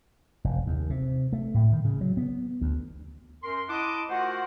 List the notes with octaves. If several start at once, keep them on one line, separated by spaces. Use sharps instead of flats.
F1
D#2
C3
A3
A2
D#3
C#3
F#3
B3
D2
F#2 A#4 C6
E4 D#5 F#5 A5 C6 D6
A3 F4 F#4 A#4 C5 F#5